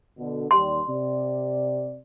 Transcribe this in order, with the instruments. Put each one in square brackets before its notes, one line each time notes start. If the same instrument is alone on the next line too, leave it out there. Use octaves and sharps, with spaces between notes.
[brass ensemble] B2 D3
[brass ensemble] D#2 G3 [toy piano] C6
[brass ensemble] C3 D5